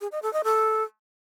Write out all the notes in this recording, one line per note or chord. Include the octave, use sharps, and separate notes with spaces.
G#4
D#5
A4
D#5
A4